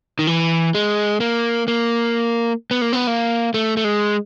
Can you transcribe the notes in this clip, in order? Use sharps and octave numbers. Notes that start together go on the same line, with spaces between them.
D#3
E3
G#3
A#3
A#3
B3
A#3
B3
A#3
A3
A3
G#3